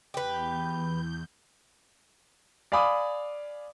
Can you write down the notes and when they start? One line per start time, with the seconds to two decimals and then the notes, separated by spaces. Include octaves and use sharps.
0.14 E2 G4 B4 G6
2.72 D5 F5 G#5 B5 D6 D#6